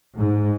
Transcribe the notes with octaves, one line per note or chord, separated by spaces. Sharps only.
G#2